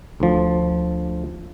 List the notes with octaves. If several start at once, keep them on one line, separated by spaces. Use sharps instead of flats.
D2 F3